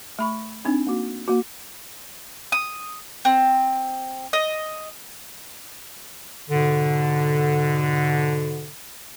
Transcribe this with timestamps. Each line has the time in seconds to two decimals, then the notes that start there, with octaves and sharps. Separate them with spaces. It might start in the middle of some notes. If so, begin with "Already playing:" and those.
0.19 A3 B5 C#6
0.65 C4 D4 D#4
0.87 A#3 F#4
1.28 A#3 F#4
2.52 D#6
3.25 C4
4.33 D#5
6.49 G#2 B2 D3